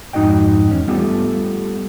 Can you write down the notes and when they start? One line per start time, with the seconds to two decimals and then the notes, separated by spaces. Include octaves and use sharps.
0.13 F2 G#2 D#4 F#4 D#5 G5
0.70 E2 C#4
0.88 G3 A3 B3 F4 G4 A4